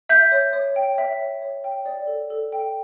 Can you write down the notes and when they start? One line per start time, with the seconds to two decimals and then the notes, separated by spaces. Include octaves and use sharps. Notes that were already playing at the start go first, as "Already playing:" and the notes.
0.09 E5 G6
0.32 C#5
0.53 C#5
0.76 G5
0.98 E5
1.19 C#5
1.42 C#5
1.64 G5
1.86 D5
2.07 A4
2.30 A4
2.52 G5